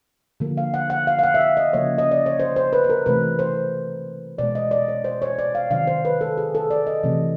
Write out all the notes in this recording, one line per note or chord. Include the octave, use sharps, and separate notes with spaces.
D3 F3 A#3
F5
F#5
F#5
F5
F5
F#5
E5
F5
D#5
C#3 F3 A#3 C#5
D#5
D5
C#5
C5
C5
B4
B4
A#4
C3 E3 A3 B4
C5
B2 G#3 D5
D#5
D5
C#5
C5
C#5
D5
F5
C3 D#3 F#3 F5
C5
B4
A4
G#4
A4
D5
D#5
C3 E3 A3